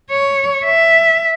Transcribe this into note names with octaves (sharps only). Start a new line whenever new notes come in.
C#5
E5